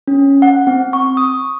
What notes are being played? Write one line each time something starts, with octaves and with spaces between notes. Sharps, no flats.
C#4
F#5
C4
C#6
D#6